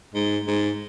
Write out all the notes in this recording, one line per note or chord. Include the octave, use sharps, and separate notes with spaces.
G#2
G#2